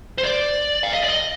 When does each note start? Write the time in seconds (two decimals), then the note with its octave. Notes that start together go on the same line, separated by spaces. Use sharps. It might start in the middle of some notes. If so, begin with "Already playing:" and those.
0.18 C5
0.23 D5
0.83 F5
0.93 D#5
1.04 D5
1.09 D#5